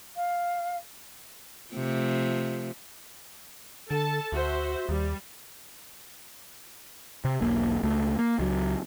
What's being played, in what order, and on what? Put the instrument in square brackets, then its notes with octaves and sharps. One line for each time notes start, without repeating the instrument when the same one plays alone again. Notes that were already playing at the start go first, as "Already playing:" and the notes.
[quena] F5
[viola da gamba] C3 F3 A3
[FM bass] D3 [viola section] A4 A5
[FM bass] D2 [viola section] F#4 C5 E5
[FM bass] D#2 [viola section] G3
[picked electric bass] C3
E1 B1 A#3
C#2 A3
A#3
C#2 F#3